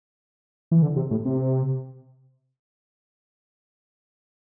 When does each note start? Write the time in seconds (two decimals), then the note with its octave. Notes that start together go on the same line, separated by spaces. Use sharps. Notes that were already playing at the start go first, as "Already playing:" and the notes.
0.71 E3
0.82 D3
0.96 C3
1.11 A2
1.25 C3